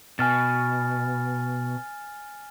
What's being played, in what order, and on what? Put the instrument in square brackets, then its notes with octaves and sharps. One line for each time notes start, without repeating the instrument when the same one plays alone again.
[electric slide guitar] B2 [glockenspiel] G#5 F6 A6